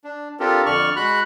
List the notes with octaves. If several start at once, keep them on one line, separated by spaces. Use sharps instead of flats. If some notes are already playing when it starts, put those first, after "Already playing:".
D4
C4 D4 F4 G4 A4 A#4
F2 D3 D5 C#6 F6
G#3 F#4 B5 F#6